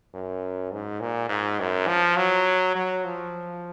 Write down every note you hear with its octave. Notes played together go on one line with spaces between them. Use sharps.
F#2
G#2
A#2
G#2
F#2
F3
F#3
F#3
F3